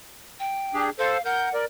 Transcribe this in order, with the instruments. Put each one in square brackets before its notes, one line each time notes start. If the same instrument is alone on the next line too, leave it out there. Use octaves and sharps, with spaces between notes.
[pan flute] G5
[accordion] D4 G4 G#4
[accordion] A4 C5 [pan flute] F5
[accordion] A#4 G6 [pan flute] F#5
[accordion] A#4 D5